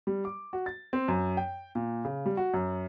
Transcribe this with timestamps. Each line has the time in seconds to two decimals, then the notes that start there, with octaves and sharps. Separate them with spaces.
0.07 G3
0.25 D6
0.53 F#4
0.66 A6
0.93 C4
1.08 F#2
1.37 G5
1.75 A#2
2.05 C#3
2.26 G3
2.37 F#4
2.54 F#2